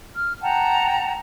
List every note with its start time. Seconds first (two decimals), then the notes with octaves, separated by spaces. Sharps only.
0.16 F6
0.42 F#5 G5 A5 A#5